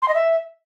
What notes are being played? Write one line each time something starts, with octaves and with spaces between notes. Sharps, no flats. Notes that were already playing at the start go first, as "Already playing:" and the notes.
C6
D#5
E5